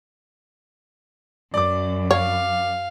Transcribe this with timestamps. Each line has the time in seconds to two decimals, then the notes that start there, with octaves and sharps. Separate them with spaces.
1.54 F#2 D5 D6
2.11 C#5 F5